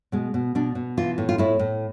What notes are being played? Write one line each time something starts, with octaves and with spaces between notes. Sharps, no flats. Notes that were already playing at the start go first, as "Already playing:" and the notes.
B2 G#3
B2
B2 D4
B2
E3 F4
A2
F4
A2 E4
A2